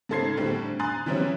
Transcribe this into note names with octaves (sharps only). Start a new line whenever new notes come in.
G#2 C#3 A4 C5 G#6 C7
A2 D3 G3 C4 G4
G#5 A#5 C6 D#6 F#6 A6
E3 F#3 G3 C4 C#4 E4